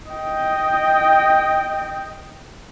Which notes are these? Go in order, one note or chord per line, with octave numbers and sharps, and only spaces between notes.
D#5 G5